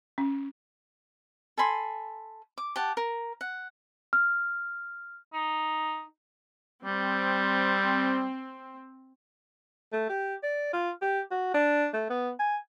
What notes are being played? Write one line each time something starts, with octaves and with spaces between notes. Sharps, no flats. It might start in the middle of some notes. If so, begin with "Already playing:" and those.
C#4
A4 G#5 B5 C6
D6
G4 F#5 A5
A#4
F#5
F6
D#4
G3 C4
A3
G4
D5
F4
G4
F#4
D4
A3
B3
G#5